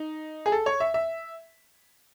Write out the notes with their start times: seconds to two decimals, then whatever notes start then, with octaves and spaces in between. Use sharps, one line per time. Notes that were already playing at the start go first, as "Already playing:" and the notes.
Already playing: D#4
0.46 G#4
0.52 A4
0.66 C#5
0.80 E5
0.94 E5